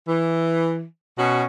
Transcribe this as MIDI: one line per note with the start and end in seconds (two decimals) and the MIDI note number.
0.08 0.83 52
1.19 1.43 47
1.19 1.43 61
1.19 1.43 66